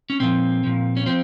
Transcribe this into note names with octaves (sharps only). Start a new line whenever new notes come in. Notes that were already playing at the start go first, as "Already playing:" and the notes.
C#4
A#2 F3 C4
A#2 F3
C#4
F3 C4